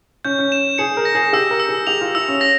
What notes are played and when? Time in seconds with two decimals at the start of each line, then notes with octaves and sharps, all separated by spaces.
0.25 C#4 G6
0.38 C#4
0.52 E7
0.78 G#4 C#7
0.97 A#4
1.05 A#6
1.15 G#4
1.33 G4 E6
1.51 A#4
1.60 E6
1.69 G#4
1.87 G4 F7
2.01 F4
2.15 E4 E6
2.28 C#4
2.41 A#6